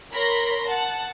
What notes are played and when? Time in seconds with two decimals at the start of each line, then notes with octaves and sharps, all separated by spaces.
0.12 A#4 C#5 B5 C6 A#6
0.67 F#5 A5